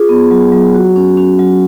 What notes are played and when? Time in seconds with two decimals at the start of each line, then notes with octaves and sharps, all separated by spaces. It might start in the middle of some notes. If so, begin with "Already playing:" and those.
Already playing: F4 G#4
0.09 B3
0.31 F#3
0.52 F#3
0.75 F#4
0.96 C#4
1.17 C#4
1.39 F#3